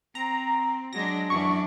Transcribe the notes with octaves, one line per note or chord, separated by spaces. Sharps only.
C4 A#5
F#3 G#3 D4 A#6
F#2 E3 D4 C#6